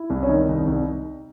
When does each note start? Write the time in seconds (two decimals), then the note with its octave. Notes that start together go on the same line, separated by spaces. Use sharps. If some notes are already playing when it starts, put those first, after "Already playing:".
Already playing: E4
0.10 C2
0.23 C#4
0.29 D#3 D#4
0.49 C2
0.67 C2